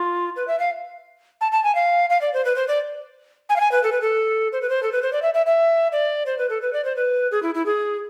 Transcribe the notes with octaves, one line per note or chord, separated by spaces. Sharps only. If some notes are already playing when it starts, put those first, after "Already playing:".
Already playing: F4
B4
E5
F5
A5
A5
G#5
F5
F5
D5
C5
B4
C5
D5
G#5
F5
G#5
B4
A4
B4
A4
C5
B4
C5
A4
B4
C5
D5
E5
E5
E5
D5
C5
B4
A4
B4
D5
C5
B4
G#4
E4
E4
G#4